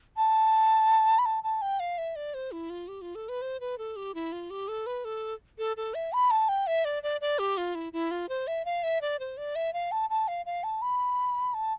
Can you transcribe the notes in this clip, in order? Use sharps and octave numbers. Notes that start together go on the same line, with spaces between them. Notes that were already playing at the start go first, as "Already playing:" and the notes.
A5
B5
A5
A5
G5
F5
E5
D5
C5
E4
F4
G4
F4
A4
B4
C5
B4
A4
G4
E4
F4
G4
A4
B4
A4
A4
A4
E5
B5
A5
G5
E5
D5
D5
D5
G4
F4
E4
E4
F4
C5
E5
F5
E5
D5
C5
D5
E5
F5
A5
A5
F5
F5
A5
B5
A5